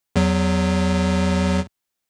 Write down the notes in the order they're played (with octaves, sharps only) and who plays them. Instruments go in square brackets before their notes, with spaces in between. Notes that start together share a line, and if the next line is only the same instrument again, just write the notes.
[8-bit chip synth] E2 F#3